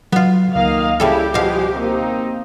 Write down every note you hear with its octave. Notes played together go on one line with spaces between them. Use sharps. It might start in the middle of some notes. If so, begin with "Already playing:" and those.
F#3 B3 F4
C#2 D#3 A#3 D#5 F5
C#3 G3 E4 G4 A4
B2 F3 G3 G#3 F5
A#3 C4 D#4